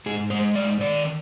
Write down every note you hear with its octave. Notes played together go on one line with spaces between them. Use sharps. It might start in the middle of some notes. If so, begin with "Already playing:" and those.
G#2 G#4
G#3 C5
G#2 D5
D#3 D5